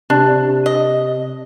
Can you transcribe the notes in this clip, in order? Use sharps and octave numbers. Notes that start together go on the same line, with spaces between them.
C3 D4
D#5